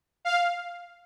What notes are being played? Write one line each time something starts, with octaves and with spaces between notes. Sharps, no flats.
F5